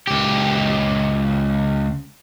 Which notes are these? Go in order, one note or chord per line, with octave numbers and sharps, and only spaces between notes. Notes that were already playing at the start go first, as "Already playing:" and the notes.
C#2 G4